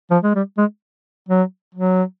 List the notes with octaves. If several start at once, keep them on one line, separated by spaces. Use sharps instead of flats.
F3
G#3
G3
G#3
F#3
F#3